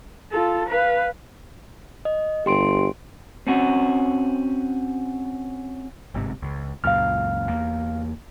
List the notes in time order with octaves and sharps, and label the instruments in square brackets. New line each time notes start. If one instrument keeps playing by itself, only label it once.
[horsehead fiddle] F4 A4
B4 F5
[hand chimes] D#5
[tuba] G1 [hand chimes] G4 C6 D7
[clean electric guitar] C4 C#4 F#4
[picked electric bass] G1 G#2 C3
C#2
[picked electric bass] C#2 F#2 A#2 [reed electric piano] F5 F6
[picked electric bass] E2 A#3